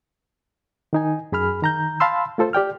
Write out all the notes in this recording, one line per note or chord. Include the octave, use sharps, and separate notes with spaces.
D#3 D#4 G#5
F#2 G#4 B5 F6
D#3 A#5 G6
F5 A5 B5 C6 E6
A3 F4 A4 C5
G4 D5 G5 F6